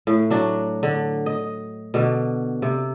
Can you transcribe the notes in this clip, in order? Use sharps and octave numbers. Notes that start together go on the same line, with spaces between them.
A2
F#3 D4 F#4
D3
D#5
B2 D3
C3